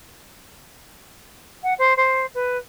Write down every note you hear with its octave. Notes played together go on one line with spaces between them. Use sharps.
F#5
C5
C5
B4